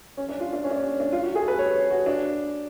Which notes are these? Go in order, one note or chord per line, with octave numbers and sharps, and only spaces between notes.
C#4
D4
F4
D4
C#4
D4
C#4
D4
F4
F#4
G#4
A4
B4
C#5
F#4
D4